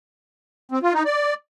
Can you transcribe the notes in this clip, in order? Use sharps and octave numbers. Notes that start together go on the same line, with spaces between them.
C4
F4
D#4
D5